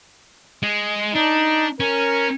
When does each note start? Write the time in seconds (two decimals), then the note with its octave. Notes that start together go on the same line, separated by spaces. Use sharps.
0.63 G#3
1.15 D4 D#4
1.80 C#4 A#4